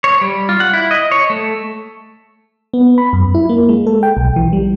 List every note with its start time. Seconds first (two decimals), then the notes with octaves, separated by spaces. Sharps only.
0.04 C#5
0.21 G3
0.49 F4
0.60 F#5
0.73 E4
0.91 D#5
1.11 C#5
1.30 A3
2.74 B3
2.98 B5
3.13 F#2
3.35 E4
3.49 A#3
3.69 G#3
3.87 A4
4.03 G5
4.17 B1
4.36 E3
4.53 G3